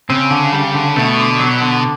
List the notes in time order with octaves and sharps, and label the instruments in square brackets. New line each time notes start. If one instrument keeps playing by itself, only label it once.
[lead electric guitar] C#3 [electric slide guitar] C4
[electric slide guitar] D3
G3
D3
[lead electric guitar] B2 [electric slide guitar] A3
[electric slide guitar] D3
F#3
D3